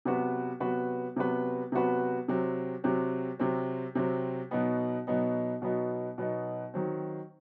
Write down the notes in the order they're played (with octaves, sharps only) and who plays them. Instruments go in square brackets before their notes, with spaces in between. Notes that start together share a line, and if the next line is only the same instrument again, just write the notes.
[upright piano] C3 F#3 B3 F#4 B4
C3 F#3 B3 F#4 B4
C3 F#3 B3 F#4 B4
C3 F#3 B3 F#4 B4
C3 F#3 C4
C3 F#3 C4
C3 F#3 C4
C3 F#3 C4
B2 F#3 B3 D#4
B2 F#3 B3 D#4
B2 F#3 B3 D#4
B2 F#3 B3 D#4
D#3 F#3 C4